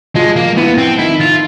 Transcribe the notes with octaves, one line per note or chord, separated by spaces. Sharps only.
F3 G#3 F4
A#3
E3 B3 E4
C4
D#3 D#4 E4
F4